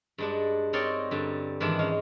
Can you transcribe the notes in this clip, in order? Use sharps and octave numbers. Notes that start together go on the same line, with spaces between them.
G2 G#3 D4
C4 D#4 A#4 C#5 D5 C6
G2 D3
G#2 D#3 E3 G#3 D4
G#3 C#4 F5